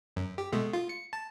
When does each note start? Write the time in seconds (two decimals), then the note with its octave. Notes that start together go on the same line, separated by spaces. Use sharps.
0.16 F#2
0.38 G4
0.52 B2 G#3 A3
0.73 F4
0.89 C#7
1.13 A5